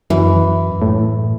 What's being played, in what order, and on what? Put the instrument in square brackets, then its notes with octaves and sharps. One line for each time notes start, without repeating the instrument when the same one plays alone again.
[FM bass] F#2 [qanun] E3
[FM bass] A2